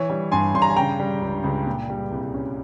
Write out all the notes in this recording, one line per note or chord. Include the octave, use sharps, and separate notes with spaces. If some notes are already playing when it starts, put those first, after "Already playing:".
Already playing: E3 C#5
G3
G2 G#5 C6
G2 C6
A#5
G#5
C#3 G5 A#5
G3
C#2
C#2
A#2
G3
C2
C#4